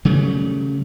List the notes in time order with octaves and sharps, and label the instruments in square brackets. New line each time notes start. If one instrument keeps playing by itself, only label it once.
[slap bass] C#3 F#3 G3 A3